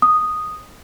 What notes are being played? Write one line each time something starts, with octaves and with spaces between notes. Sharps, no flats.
D#6